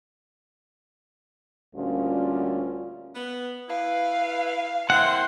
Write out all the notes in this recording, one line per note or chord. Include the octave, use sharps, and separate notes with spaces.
D2 A#2 G3 C#4 F4
B3
E4 B4 F5
A#3 C4 E4 F#5 C6